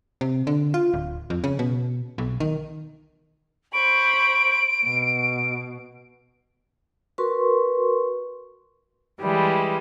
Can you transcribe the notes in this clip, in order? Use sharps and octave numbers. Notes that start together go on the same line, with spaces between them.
C3
D3
F4
D1
F2
C#3
B2
B1
D#3
C5 B5 C#6 D7
B2
F#4 A#4 B4 C6 C#6
E3 G3 G#3